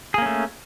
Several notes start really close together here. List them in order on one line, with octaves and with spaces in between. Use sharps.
G#4 A#3 C#4 A3